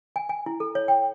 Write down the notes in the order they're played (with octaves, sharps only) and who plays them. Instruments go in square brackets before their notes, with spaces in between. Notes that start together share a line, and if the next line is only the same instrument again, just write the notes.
[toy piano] G#5
G#5
E4
A4
C#5
G5